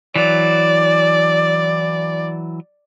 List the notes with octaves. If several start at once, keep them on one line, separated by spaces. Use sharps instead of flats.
E3 F#3 D5